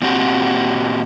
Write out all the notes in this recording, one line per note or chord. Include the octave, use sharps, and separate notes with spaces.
A#2 C4 F#4 G4